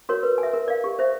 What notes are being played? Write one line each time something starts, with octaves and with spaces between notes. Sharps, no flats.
F#4 A#4 C#5
B4
G#5
E5
A#4
D5 F5
G4
C5 E5